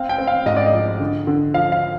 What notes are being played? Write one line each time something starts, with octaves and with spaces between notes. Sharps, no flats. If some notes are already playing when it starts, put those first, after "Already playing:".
Already playing: C4 F5
G5
C4
F5
G#2 D#5
D5
D#5
F3
D3
D3
F3 F5
F5